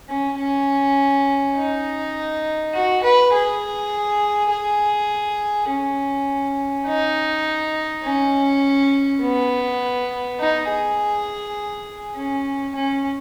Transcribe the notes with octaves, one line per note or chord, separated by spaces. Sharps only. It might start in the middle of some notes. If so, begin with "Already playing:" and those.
C#4
C#4
D#4
F#4
B4
G#4
G#4
C#4
D#4
C#4
B3
D#4
G#4
C#4
C#4